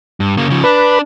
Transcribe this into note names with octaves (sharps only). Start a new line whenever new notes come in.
G2
C#3 A#3
C#3 F3
D4 B4